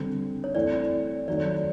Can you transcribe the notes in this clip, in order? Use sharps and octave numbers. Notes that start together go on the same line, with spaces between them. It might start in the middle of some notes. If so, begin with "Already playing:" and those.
Already playing: D3 G3 C4
C#5
E3 A3 C4 D5
D#3 F#3 A3 D5